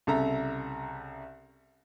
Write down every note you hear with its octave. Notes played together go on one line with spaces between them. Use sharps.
C2 C#3 A4 E5 A#5